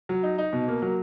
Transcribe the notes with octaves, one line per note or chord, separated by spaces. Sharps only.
F#3
D#4
D#4
B2
A#3
F#3